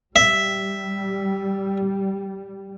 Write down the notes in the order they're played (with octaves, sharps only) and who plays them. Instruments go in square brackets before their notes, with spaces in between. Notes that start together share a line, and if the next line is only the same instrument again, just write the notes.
[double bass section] G3 [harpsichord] E5